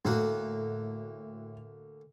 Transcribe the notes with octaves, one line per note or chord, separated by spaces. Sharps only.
D2 A2 A#3 F#4